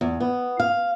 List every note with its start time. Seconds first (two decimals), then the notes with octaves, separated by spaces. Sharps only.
0.01 E2
0.20 B3
0.60 F5